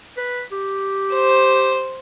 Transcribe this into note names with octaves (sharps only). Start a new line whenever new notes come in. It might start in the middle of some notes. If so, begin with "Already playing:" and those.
B4
G4
C5